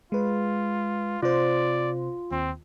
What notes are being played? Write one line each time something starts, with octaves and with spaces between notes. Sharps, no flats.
G#3 F4 B4
C3 F4 C5 D5
D#2 C4